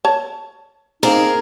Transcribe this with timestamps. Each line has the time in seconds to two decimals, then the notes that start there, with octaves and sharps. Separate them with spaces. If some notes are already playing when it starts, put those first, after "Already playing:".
0.05 C#5 A5
1.03 A#3 C4 D#4 G#4 A#4 C5